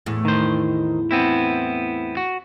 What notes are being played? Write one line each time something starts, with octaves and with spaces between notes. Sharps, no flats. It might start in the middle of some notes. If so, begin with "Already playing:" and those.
E2 A2
D#3 C5
B3 C4 E4
F#4